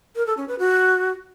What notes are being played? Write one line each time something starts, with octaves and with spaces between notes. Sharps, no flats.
A#4
A4
C#4
B4
F#4